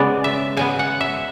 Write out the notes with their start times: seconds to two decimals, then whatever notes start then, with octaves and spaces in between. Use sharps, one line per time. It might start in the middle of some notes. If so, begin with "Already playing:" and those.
Already playing: C#3 G#3 B3 D5
0.24 E5
0.57 C#3 G#3 B3 G#5
0.79 F#5
1.01 E5